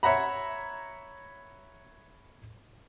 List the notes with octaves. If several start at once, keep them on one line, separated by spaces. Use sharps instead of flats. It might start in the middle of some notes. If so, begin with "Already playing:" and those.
C#5 E5 F#5 A#5 B5